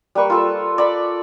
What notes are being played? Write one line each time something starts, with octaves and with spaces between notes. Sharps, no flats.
G3 A#3 B4 C#6
F4 A4 E6
D5 B5 C#6